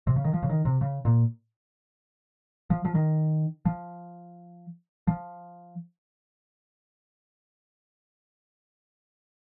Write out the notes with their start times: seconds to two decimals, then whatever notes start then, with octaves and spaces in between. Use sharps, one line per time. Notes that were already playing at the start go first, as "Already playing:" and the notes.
0.07 C3
0.16 C#3
0.24 D#3
0.33 F3
0.43 C#3
0.49 D#3
0.65 C3
0.81 C#3
1.05 A#2
2.70 F3
2.85 F3
2.95 D#3
3.65 F3
5.07 F3